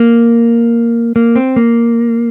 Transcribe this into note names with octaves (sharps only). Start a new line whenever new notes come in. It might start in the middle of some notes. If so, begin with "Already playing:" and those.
Already playing: A#3
A#3
C4
A#3